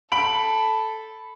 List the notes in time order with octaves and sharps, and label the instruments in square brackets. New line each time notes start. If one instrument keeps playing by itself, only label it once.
[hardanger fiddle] A4 [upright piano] B5 D7 F#7